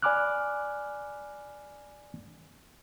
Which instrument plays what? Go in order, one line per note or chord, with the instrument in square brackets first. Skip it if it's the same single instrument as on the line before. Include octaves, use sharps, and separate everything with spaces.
[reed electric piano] D5 G#5 B5 D6 F6 F#6